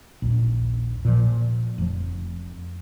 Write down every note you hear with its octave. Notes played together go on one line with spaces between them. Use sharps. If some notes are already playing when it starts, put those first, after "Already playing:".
D#1 A#1
A#2 F3
F1 F3